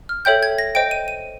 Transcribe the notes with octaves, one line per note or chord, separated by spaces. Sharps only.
F6
A4 C#5 E5 G5 G6
G#6
A#6
C5 D#5 G5 D7
D#7
D#7